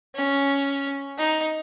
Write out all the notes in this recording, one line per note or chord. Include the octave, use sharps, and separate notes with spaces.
C#4
D#4